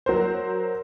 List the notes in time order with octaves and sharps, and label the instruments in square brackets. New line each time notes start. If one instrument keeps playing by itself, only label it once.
[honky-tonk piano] F#3 A#4 C5